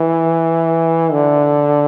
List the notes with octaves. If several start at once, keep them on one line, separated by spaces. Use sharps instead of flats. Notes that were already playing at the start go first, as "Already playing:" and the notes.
Already playing: E3
D3